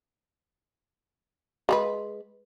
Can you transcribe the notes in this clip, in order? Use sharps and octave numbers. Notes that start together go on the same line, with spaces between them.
G#3 G#4 B4